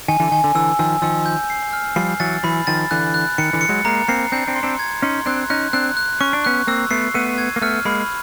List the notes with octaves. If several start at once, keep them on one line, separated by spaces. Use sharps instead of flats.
D#3 G#5
D3 E3
D#3 G#5
D3
D3 E3 E6
D#3 F3 E6
D#3 F3 E6
G6
C7
F6
F3 G3 C7
E3 F#3 A6
E3 F#3 B5
D#3 F3 A6
D3 E3 F#6
F#6
D#3 C#7
D3 E3
C#7
F#3 G#3
G#3 A#3 A#5
A#3 C4 C7
C4 D4 G6
C4 D4
C6
C4 D4
G#6
C#4 D#4 C6
C4 D4 F#6
C#4 D#4 F#6
C4 D4 F#6
F#6
C#4 C#6
D4
B3 C#4 F#6
A#3 C4 E6
A3 B3 C7
A3 B3 D#7
G#6
A#3
A3 B3 F6
G#3 A#3 B5